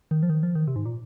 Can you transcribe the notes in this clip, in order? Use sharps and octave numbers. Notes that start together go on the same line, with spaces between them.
D#3
F3
D#3
F3
D#3
C3
G#2
A#2